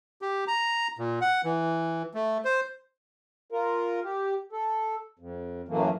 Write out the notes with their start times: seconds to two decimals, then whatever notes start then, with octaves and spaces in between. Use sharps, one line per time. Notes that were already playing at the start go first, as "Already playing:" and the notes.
0.22 G4
0.47 A#5
0.99 A#2
1.21 F#5
1.44 E3
2.14 A3
2.45 C5
3.51 F4 A#4
4.04 G4
4.52 A4
5.19 F2
5.69 F#2 A2 E3 F#3 A3 A#3